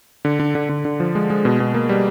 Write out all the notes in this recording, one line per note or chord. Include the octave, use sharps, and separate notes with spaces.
D3
D3
D3
D3
D3
F3
G#3
G#3
B2
B2
A#3
G3